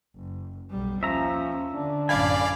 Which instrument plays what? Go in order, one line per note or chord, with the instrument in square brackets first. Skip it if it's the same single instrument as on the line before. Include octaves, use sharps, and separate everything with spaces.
[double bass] F#1
B1 G3
[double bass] D#2 C#4 [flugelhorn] F3 [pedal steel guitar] E5 A#5
[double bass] D3 [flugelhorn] D4
[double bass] A1 F#2 [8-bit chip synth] D5 F5 B5 [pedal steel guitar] G#5